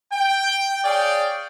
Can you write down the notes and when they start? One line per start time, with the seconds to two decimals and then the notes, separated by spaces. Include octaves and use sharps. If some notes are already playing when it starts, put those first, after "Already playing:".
0.12 G5
0.85 G#4 C#5 D5 F5 G5